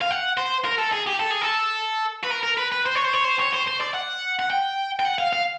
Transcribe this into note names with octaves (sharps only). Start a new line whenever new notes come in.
F5
F#5
C5
A#4
A4
G#4
G4
A4
G#4
A4
B4
A#4
A#4
B4
B4
C5
C#5
C5
C#5
C5
C#5
C5
C5
D5
F#5
F#5
G5
G5
F#5
F5
F5